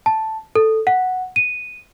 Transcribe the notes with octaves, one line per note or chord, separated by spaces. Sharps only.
A5
A4
F#5
D#7